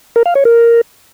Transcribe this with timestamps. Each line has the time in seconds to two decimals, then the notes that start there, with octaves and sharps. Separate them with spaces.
0.16 A#4
0.26 F5
0.35 C#5
0.45 A#4